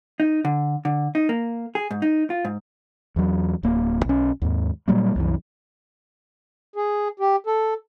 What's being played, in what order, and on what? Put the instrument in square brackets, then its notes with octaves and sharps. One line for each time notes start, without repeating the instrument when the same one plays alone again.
[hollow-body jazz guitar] D#4
D3
D3
D#4
A#3
G#4
G#2
D#4
F4
G#2
[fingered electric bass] E2 F#3
D1 A#3
B1 C#4
D#2 G#2
A#2 F#3 G3 A#3
C2 F#2 E3
[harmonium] G#4
G4
A4